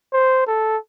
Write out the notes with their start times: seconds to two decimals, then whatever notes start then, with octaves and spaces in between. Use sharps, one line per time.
0.13 C5
0.47 A4